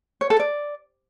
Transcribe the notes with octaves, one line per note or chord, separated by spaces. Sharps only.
C#5
A4
D5